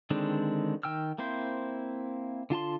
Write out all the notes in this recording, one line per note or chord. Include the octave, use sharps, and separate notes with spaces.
D3 D#3 G#3 C4 D4
D#3 G5 E6 F6
A#3 C4 E4 C5
D3 F4 A5 C6